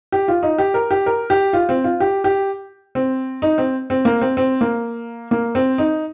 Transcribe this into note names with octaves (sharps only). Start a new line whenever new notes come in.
G4
F4
D#4
G4
A#4
G4
A#4
G4
F4
C4
F4
G4
G4
C4
D#4
C4
C4
A#3
C4
C4
A#3
A#3
C4
D#4